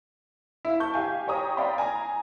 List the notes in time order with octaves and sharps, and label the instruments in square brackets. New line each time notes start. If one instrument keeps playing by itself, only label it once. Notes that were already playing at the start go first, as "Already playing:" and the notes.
[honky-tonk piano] E4 F5
A5 C#6 G6
G4 F5 G#5
G4 C#5 G5 A#5 D#6
D5 F5 G5 A#5 B5
G#5 A#5